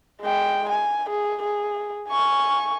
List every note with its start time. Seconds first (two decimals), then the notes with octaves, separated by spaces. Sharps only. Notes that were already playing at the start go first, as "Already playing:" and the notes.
0.21 G#3 G5
0.69 G#5
1.09 G#4
1.43 G#4
2.08 G#5 C#6